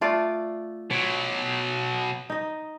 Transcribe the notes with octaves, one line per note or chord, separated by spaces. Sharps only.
A3 F4 D5
B2 F#3 C#5
D#4 D#5